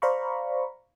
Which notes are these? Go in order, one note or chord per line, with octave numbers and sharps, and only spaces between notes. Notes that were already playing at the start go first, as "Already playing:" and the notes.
C5 D5 F5 A#5 B5 C#6